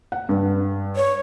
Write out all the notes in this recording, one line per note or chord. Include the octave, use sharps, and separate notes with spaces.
F#5
G2
C#5